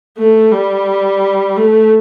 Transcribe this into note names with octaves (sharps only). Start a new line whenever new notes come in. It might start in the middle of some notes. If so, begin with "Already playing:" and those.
A3
G3
A3